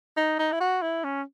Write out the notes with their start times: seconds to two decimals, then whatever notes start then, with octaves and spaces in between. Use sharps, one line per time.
0.17 D#4
0.39 D#4
0.52 E4
0.60 F#4
0.82 E4
1.04 C#4